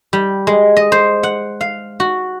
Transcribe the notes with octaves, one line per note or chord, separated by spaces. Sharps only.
G3
G#3
D#5
C5
F#5
F5
F#4